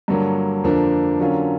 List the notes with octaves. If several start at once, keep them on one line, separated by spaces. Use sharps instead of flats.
G2 D3 F#3 A#3
F2 D3 F3 A#3 D4
D3 F#3 A#3 C#4 F4